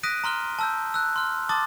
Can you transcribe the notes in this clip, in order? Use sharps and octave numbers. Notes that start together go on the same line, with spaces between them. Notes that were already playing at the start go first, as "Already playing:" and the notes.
D#6 F#6 A#6 B6 D7 D#7
A#5 C6 F6 G7
A5 E6 G6
E6 F#6
C6 F6
A5 C6 D6 D#6 A6